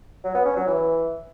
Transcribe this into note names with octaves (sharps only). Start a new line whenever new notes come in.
F#3
B3
C#4
F#3
E3